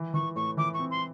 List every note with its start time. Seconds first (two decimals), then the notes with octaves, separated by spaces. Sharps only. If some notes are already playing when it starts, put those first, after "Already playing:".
Already playing: E3
0.14 E3 C#6
0.36 A2 C#6
0.57 E3 D6
0.74 C#6
0.79 C4
0.91 C6